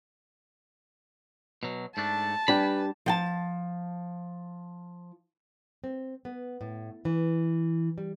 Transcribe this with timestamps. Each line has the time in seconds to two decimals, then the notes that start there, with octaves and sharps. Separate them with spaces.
1.63 B2 F#3
1.97 G#2 A3 D4 A5
2.48 G3 D4 G4 B4 G#5 B5
3.06 F3 G5 A5
5.84 C4
6.25 B3
6.61 A2
7.05 E3
7.98 G3